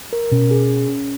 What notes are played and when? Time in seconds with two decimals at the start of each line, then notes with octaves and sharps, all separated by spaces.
0.13 A#4
0.32 B2 C#4
0.51 G#4
0.70 C#4
0.89 C#4